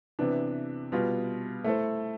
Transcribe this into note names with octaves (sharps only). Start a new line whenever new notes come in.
C3 E3 B3 D4
B2 G3 B3 F4
A3 E4 A4 C5